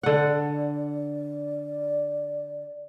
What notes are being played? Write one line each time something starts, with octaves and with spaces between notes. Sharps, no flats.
D3 D5 F#5